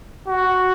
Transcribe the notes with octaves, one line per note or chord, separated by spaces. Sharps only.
F#4